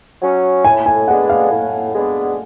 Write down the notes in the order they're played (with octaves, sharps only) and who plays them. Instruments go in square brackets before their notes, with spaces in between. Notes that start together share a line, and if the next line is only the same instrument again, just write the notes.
[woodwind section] F#3 C#4
[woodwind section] A2 [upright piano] G#5
[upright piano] G#5
[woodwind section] G#3 B3 D4 [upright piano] F#5
[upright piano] F5
[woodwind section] A2
G#3 B3 D4